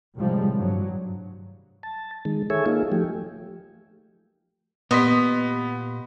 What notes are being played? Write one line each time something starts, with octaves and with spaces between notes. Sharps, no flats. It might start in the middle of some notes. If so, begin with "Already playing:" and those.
A2 C3 D#3 F3 G3 G#3
G2 F#3
A5
D#3 G#3
G#4 A4 C#5 E5 G#5
A#3 D#4 F4 G#4
F3 A3 G4
A#2 B3 G4 D#5 C6 B6